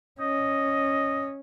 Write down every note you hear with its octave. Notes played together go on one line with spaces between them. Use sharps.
C#4 D#5